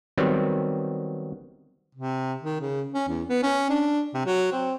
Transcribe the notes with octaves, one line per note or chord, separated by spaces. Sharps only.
D#3 F#3 G3 B3 C4
C3
D#3
C#3
C#4
E2
B3
C#4
D4
C3
F#3
C4